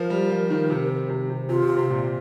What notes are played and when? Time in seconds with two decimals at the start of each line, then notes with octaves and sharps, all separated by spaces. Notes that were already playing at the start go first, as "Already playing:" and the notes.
Already playing: F3 A#4
0.10 G3
0.30 F3
0.50 D#3
0.70 C3
1.09 C3
1.30 C3
1.49 C3 F4
1.62 C3
1.77 C3
1.90 A#2